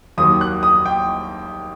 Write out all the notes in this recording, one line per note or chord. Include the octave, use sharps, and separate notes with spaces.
D#2 D#3 F#3 A#3 D#6
F#6
D#6
G5